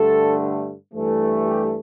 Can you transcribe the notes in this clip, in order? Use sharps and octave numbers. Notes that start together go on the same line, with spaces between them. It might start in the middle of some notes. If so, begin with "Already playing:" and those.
Already playing: G2 D3 A3 A4
G2 E3 A3
G4